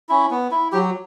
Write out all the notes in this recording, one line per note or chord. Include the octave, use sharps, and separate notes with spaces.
C#4 E4
B3
E4
F#3 G4